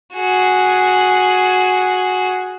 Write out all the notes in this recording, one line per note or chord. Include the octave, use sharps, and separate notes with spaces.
F#4 G#4